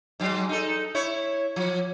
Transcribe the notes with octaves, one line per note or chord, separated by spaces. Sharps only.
G#2 F#3
D#4 A4
E4 C#5
F3